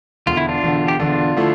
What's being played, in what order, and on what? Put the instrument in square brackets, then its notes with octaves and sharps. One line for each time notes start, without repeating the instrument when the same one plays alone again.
[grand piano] E1 E2 D3 [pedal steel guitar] F4
[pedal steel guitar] E4
D4 F4
[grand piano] E1 E2 D3
[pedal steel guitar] G4
[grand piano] E1 E2 D3 [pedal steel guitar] D4 F4
[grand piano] D3 F3 A3 E4